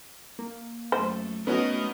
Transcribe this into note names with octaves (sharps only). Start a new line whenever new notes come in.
A#3
F#2 A3 C5
A3 B3 C#4 D#4 F#4 A#4 D#5